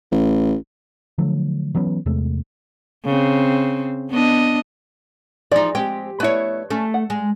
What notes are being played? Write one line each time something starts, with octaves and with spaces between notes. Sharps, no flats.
A1
D3 F3 F#3 A3
E3 F#3 B3 C#4
E2 C3 G#3 A3
C#3 C4
B3 D4 D#5
E3 F3 D#4 G#4 D5
G#3 C4 G4
A3 B3 E4 B4 C#5
A3 C#4
F#5
G#3